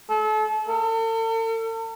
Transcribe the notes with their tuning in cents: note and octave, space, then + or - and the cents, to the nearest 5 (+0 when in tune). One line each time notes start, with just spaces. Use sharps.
A4 -35
A4 +45